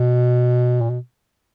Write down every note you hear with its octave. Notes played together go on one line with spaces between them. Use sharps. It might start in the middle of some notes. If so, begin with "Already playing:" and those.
Already playing: B2
A#2
B2